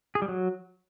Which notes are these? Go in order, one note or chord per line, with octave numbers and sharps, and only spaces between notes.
G#4
G3
F#3